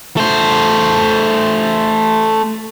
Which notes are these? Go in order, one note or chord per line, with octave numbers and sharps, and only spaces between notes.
A3 C5